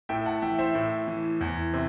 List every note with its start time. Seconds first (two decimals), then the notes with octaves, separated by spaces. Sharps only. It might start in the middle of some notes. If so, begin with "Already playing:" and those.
0.09 A2 E5 G5
0.25 F#5 A5
0.42 E3 E5 G5
0.59 C5 E5
0.75 A2
1.08 E3
1.41 E2
1.74 C3